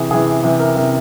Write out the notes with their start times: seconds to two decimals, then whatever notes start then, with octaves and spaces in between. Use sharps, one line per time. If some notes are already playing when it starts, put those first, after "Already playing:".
Already playing: C3 E3 G#4
0.11 C3 E3 G#4
0.43 C3 E3
0.59 A#4
0.75 C3 E3 A#4